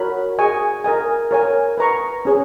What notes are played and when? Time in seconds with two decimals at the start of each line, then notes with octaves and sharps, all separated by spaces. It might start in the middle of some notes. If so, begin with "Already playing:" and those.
Already playing: F#4 A#4 C#5 F#5 B5
0.38 G#4 D#5 G#5 C#6
0.84 A#4 D#5 G#5
1.31 A#4 C#5 G#5
1.78 B4 D#5 A#5 C#6
2.25 C#4 G#4 C#5